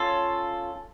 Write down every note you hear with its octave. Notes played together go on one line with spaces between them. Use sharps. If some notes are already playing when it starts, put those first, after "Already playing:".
Already playing: C#4 F4 A4